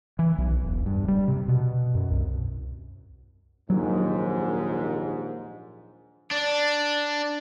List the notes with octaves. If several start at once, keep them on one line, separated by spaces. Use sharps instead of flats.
E3
B1
E1
G2
G3
C3
B2
F#2
C2
A#1 D#2 G#2 F#3
D4 D5